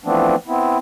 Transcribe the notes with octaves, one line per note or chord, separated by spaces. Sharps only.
E3 F3 A3 B3 C4 D4
B3 C4 E4